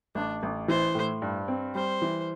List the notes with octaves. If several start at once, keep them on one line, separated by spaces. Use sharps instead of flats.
A1 D4
A1
E3 C5
A2
G2
C4
G3 C5
E3